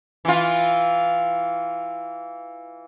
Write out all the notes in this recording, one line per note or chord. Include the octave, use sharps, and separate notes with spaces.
E3 F4